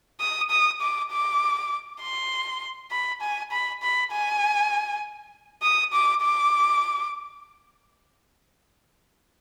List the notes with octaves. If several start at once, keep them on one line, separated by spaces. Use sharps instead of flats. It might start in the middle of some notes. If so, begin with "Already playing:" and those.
D#6
D#6
D6
D6
C6
B5
G#5
B5
B5
G#5
D#6
D6
D6